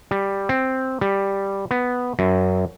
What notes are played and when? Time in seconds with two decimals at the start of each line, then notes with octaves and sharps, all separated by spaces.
0.11 G3
0.49 C4
1.01 G3
1.71 B3
2.19 F#2